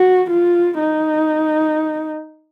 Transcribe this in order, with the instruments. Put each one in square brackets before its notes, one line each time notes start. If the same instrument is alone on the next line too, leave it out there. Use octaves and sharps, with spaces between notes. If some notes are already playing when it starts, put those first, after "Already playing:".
Already playing: [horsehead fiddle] F#4
F4
D#4